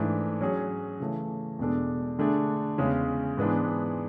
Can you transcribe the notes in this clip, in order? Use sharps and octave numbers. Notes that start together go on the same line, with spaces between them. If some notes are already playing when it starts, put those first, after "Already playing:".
Already playing: G#2 E3 A3 D4
F#3 C#4 G#4
C#3 E3 A3
E2 B2 G#3 D4 A4
D3 A3 D4 G#4
E2 C#3 G#3 C#4
G#2 E3 G#3 B3 D4